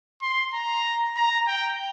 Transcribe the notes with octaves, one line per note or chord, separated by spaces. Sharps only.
C6
A#5
A#5
G5